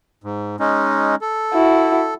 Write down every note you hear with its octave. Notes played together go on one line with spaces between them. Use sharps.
G#2
G#3 C#4 D#4
A4
E4 F#4